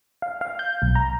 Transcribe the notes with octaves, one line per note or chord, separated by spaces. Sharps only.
F5
F5
G6
B1
A#5